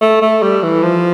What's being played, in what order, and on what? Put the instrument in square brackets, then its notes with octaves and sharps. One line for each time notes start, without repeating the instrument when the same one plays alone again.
[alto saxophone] A3
A3
G3
E3
F3